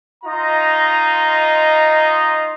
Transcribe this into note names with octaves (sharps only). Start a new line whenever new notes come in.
D#4 F4 D#5 A#5